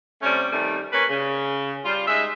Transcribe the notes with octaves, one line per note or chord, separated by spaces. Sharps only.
C3 G3 A3 C#4
D#3 G3 A3 C4
A#3 C#4 B4
C#3
G3 F4
G#3 D#4 E5